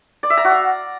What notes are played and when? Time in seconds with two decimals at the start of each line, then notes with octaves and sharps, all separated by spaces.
0.23 D5
0.30 E5
0.37 A#5
0.45 F#4
0.52 F5